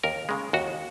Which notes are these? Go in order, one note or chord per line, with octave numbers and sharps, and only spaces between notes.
D#2 A#4
C#3 G#3
D#2 F#4